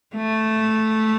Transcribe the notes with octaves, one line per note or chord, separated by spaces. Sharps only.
A3